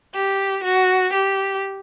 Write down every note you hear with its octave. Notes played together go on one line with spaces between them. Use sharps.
G4
F#4
G4